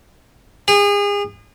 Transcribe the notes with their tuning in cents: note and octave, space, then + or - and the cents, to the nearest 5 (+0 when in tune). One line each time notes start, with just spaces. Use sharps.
G#4 -35